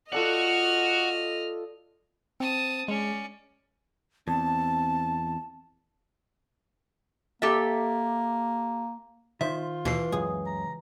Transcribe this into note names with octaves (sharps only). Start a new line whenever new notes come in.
F4 F#4 A4 D5 D#5 F#5 F6
C4 A5 D#6
G#3 C#4 D5
E2 C4 A5
A#3 G4 A4 E5
D#3 F4 C5 E5
D#2 B2 E3 C7
C#2 F#2 G#4
A#5